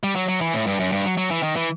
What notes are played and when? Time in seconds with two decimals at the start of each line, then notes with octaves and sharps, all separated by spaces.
0.03 G3
0.16 F#3
0.28 F#3
0.41 E3
0.54 A2
0.67 G2
0.80 F#2
0.92 G2
1.05 F#3
1.17 F#3
1.31 E3
1.43 D#3
1.56 E3